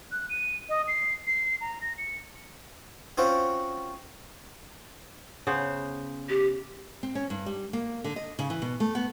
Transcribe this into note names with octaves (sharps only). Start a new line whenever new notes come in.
F#6
D#7
D#5
C7
C7
A#5
A#6
C#7
C4 C#4 F4 F#4 C5
C#3 B3 C5
G4
C4
C#4
G2
G3
A#3
D3
D#5
C#3
E3
B2
A3
B3